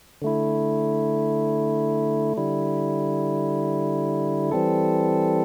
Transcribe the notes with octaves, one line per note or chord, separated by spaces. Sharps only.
D3 A3 E4
D3 G3 E4
E3 G3 C4 A4